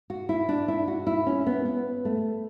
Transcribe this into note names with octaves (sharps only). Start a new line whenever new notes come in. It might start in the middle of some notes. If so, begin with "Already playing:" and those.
F#4
E4
D4
E4
F#4
E4
C#4
B3
B3
A3